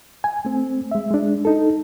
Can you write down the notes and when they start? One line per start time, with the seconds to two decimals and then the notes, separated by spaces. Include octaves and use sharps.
0.24 G#5
0.45 A3 C4
0.91 G#3 E5
1.11 G#3 D4
1.45 D#4 A4